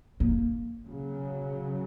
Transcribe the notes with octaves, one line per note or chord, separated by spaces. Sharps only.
A#3
C#3 F#3